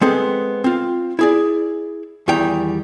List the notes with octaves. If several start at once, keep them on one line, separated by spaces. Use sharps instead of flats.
G#3 B3 C4 G#4 A4
C4 F4
E4 G#4 D5
E2 D#3 G3 E4 G5 A#5